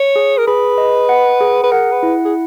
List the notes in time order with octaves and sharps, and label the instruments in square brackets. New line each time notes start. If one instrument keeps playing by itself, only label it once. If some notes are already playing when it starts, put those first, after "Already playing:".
Already playing: [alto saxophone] C#5
[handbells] G#4
[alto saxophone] A#4
[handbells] G#4 [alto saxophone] B4
[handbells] D#5
F#5
G#4
[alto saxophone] B4
[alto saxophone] A#4 [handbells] F#5
[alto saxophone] B4
[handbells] E4
[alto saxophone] G#4